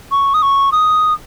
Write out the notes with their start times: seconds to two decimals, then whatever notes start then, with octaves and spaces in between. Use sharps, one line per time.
0.11 C#6
0.33 D#6
0.42 C#6
0.72 D#6